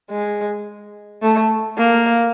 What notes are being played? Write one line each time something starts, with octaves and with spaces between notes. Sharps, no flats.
G#3
A3
A#3